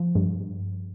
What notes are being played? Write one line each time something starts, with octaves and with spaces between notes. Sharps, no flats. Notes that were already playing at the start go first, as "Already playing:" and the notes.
Already playing: F3
G2